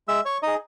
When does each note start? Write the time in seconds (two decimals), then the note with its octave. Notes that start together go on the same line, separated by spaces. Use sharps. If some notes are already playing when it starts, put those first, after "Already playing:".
0.08 G#3 E5 E6
0.25 C#5 C#6
0.42 D#4 G#4 D#5 D#6